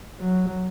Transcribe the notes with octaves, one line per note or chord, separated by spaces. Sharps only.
F#3